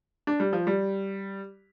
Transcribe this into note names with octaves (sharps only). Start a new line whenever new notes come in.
D4
G3
F3
G3